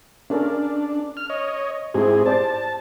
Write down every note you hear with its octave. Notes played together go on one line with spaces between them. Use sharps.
C#4 D4 A4 A#4
F6
C#5 D#5
G#2 C4 E4 G4 G#4
C5 D5 A5